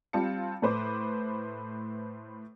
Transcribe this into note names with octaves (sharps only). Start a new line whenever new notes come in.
G3 C4 F4 A5 C#7
A2 A3 B4 C5 D6